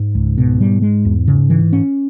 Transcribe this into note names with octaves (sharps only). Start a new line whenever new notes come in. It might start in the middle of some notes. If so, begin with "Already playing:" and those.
Already playing: G#2
C#2
B2
G3
G#3
E2
C#3
E3
C#4